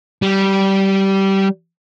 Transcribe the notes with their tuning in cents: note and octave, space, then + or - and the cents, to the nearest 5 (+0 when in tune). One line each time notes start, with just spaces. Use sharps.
G3 -15